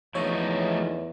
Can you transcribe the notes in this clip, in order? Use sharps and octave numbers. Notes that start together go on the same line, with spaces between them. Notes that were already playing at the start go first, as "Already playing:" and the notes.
E2 F3 A3 D#4 C#5